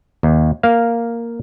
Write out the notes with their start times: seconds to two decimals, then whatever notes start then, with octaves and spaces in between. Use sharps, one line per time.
0.23 D#2
0.63 A#3 F5